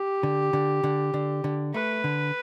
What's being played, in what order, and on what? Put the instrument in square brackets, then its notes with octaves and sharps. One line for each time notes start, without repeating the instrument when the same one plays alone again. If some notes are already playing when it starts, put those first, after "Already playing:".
Already playing: [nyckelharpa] G4
[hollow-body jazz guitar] D3
D3
D3
D3
D3
[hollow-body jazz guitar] A3 [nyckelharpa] B4
[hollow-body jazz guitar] D3